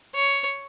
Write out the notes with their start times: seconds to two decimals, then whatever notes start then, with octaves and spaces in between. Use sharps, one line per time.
0.15 C#5